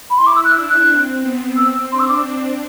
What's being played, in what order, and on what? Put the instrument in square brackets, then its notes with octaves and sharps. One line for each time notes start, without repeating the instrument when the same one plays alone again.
[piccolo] B5
[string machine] E4 [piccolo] C6
[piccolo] D6
E6
F#6
[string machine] D4 [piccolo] E6
[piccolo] F#6
[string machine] C4
B3
[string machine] C4 [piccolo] E6
[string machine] D4 [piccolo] C6
[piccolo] E6
D6